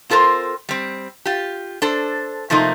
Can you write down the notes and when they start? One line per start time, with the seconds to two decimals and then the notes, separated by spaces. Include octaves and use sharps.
0.10 C4 F4 A4 A#4 C5
0.69 G3 C4
1.25 F4 G4
1.82 D4 A4 C5
2.50 C3 F3 A3 A#3 D#4